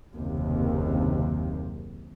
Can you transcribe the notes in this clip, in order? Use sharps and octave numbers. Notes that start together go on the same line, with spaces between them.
F#1 D#2 C3